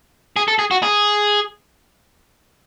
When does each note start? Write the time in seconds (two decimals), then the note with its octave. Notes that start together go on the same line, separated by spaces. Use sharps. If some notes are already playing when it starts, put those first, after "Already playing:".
0.36 G#4
0.48 A4
0.59 G#4
0.71 F#4
0.83 G#4